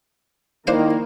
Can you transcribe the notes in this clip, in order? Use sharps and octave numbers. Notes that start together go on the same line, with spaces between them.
D#3 A#3 D4 E4 C5 F5